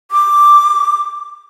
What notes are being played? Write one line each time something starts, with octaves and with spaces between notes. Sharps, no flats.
D6